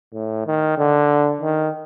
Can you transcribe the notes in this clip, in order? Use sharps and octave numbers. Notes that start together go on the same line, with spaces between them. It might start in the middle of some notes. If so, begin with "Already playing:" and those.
A2
D#3
D3
D#3